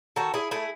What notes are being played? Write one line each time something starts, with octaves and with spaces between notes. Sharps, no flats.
D#3 F#4 A4
E4 G#4
A3 E4 G#4